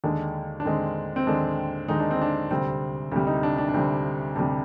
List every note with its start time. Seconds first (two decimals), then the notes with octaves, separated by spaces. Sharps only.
0.04 D#2 D3 G#3 D4
0.60 D4
0.65 D#2 D3 G#3 C4
1.16 C4
1.27 D#2 D3 G#3 D4
1.88 D#2 D3 G#3 D#4
2.00 D4
2.11 C4
2.22 D4
2.51 D2 C3 G3 C4
3.12 D2 C3 G3
3.27 D#4
3.43 D4
3.58 D4
3.69 D4
3.74 D2 C3 G3 C4
4.36 D2 C3 G3 D4